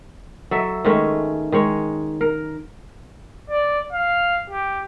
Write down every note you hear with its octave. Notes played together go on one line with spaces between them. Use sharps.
F#3 A4 E5
D#3 G#3 A3 C#4
D#3 G#3 C#5
A#4
D5
F5
G4